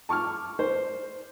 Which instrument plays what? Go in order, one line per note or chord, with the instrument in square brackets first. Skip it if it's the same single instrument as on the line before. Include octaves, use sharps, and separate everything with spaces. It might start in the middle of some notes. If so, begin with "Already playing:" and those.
[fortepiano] A5 C#6 D6 F6
C5